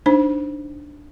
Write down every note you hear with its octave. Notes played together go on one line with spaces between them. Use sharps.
D4 D#4 C5